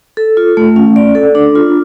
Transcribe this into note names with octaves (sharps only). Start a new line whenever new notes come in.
A4
F4
A3
C#4
D5
A4
D4
F4